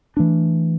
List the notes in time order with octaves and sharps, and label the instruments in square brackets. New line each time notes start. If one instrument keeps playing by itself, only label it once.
[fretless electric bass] E3 A3 D4